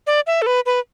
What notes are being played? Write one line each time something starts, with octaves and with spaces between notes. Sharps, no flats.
D5
E5
A4
B4
B4